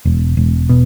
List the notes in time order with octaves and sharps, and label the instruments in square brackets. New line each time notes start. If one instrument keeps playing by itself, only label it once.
[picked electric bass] E1
E1
B2